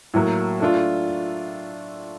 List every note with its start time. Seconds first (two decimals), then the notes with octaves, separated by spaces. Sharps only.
0.14 A2 F#3 A#3
0.60 A3 D4 F4